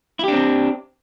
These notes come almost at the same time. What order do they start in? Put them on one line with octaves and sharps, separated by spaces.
E4 G4 D4 C4